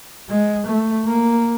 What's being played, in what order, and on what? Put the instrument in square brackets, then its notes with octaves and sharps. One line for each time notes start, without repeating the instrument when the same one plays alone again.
[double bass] G#3
A3
A#3